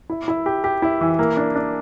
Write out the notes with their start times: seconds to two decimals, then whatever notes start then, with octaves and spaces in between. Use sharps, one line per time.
0.10 E4
0.28 E4
0.46 G4
0.64 G4
0.82 E4
1.01 E3
1.19 A#3
1.37 D4
1.55 D4